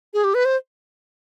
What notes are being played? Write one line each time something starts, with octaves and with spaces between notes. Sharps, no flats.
G#4
G4
B4
C5